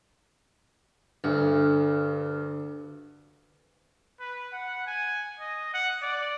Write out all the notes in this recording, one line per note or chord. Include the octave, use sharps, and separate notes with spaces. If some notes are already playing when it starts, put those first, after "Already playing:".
D2 G2
B4
F#5
G#5
D#5
F#5
D5